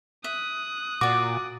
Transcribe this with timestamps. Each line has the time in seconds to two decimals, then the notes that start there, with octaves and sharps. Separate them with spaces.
0.24 E5 D#6 F#6
1.01 A#2 F#4 D5 D6